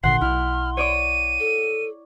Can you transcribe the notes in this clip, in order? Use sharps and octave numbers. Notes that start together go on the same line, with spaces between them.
G#1 A#2 D3 F#5 C6 C7
B1 E4 F6
C#5 D5 D6 D#7
A4